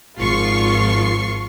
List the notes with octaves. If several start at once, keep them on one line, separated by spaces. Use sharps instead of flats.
G#1 F3 F4 C#6 C7